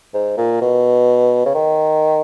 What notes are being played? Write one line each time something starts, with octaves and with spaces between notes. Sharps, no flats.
G#2
A#2
B2
C#3
D#3